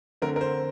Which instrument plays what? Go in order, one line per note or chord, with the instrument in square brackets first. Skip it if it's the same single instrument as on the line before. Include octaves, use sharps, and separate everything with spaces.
[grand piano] D3 A3 C4 A#4
A#4
C5